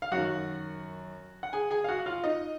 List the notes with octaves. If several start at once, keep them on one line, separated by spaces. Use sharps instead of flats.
F5
F#2 D#3 F#4 F#5
F#5
G#4 G#5
G#4 G#5
F5
F#4 F#5
F4 F5
D#4 D#5